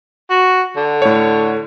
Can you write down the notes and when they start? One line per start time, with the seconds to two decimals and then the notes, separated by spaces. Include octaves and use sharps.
0.30 F#4
0.76 D3
1.02 A2 C#5